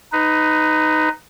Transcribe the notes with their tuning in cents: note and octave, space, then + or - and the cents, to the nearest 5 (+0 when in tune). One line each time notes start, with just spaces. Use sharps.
D#4 +0 B4 +20